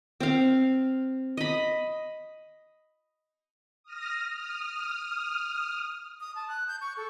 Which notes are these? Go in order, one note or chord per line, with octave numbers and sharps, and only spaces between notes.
C4 F5
D#5 B5
D#6 F6 A#6
D#6 F6
D#6
A5
F#6
G6
C#6
A4